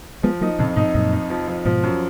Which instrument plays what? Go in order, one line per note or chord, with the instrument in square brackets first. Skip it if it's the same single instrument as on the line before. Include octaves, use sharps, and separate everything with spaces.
[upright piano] F3 [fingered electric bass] G#3 B3
[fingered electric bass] F#3 A#3 [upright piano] D#4
[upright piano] F2 [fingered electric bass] A#2 C#3
[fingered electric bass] G#2 B2 [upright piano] D#4
[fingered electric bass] F#2 A#2 [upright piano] D#4
[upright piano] D#4
F3
F3
[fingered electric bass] G#2 B2 [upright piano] F3
[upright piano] F#2